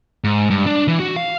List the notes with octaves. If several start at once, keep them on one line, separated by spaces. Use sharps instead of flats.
G#2
G2
D4
E3
F#4
F5